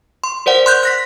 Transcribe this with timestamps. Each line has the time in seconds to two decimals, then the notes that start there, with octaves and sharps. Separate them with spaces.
0.24 C6
0.46 A#4 C5 D5 F#5
0.66 C6 F#6 G6
0.83 F#6 A#6 B6